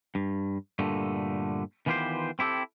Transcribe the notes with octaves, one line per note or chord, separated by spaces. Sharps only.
G2
G2 A#2 D3 A3
D#3 E3 B3 F4 G4 C5
C4 E4 G4 A4